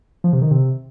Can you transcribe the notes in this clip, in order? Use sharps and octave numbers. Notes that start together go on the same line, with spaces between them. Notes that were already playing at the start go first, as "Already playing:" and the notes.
F3
C3
D#3
C3